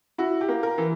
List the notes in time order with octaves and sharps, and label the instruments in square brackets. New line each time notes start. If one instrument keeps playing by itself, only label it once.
[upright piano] E4 F#4
G4
A#3
A#4
E3